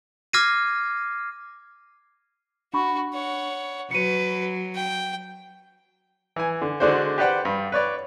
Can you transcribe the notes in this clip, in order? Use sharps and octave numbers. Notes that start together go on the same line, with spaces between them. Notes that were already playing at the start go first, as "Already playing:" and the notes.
D6 F6 G#6 A#6 C7 D#7
D4 F#4 B5 C#6
C#5 F#5
F#3 B4 C#7 D#7
G5
E3 G#5
D3
D3 G#3 D4 F#4 C5
G4 B4 C5 D5 F#5 G5
G2
B4 C#5 D5